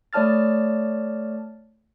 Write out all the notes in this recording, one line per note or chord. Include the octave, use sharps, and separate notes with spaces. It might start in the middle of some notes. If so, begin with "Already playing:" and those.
A3 C#5 D5 A5 F6 A6